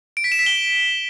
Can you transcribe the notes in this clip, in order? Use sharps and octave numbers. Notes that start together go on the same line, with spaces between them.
D7
B6
E7
B6
G7